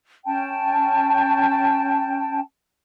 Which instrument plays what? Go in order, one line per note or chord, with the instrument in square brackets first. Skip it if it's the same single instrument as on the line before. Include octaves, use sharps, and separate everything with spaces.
[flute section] C#4 G5 A5